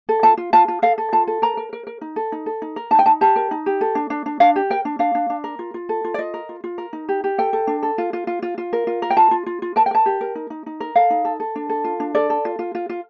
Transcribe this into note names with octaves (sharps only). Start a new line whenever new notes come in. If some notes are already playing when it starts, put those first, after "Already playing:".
A4
F4 A5
F4
F4 A5
F4
A4 F5
A4
F4 A5
A4
A#4 A#5
A#4
A#4
A#4
D#4
A4
D#4
A4
D#4
A#4
D#4 A5
G5
D#4 A5
G4 A5
A#4
D#4
G4
A4
D4
D4
D4
D4 F5
G4
A#4 G5
D4
D4 F5
D4
D4
A#4
F4
F4
A4
F4
D5
F4 D#5
A#4
F4
F4
A#4
D#4
G4
G4
A4 G5
A4
D4
A4
F4
F4
F4
F4
F4
A#4
F4
A#4
G5
F4 A5
F4
F4
F4
A#4 A5
G5
A#4 A5
G4
A#4
D#4
D#4
D#4
A#4
A4 F5
D#4
A4
A4
D4
A4
F4
D4
A4 D5
A4
F4
F4
F4
F4